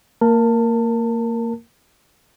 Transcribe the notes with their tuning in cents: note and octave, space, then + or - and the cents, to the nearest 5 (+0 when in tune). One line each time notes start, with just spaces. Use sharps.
A#3 -25 A#4 +0 A5 +25